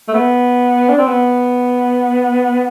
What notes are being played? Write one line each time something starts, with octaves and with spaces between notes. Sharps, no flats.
A3
B3
D4
C4
B3